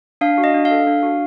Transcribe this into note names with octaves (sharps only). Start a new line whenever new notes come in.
D4 F5
F#4
D#5
D4
F5
A4
D4
F#4